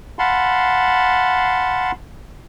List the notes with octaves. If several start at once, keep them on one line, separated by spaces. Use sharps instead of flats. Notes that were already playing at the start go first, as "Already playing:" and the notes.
F5 F#5 A5 B5 C6